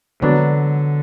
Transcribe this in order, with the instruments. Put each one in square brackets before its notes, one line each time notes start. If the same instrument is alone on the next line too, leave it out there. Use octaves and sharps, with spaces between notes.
[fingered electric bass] D3 [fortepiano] F#3 B3 D4